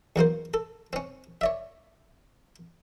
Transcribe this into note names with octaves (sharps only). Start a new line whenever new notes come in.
E2 F#3 A#3 C5
A4
C4 C#4
C#5 D5 E5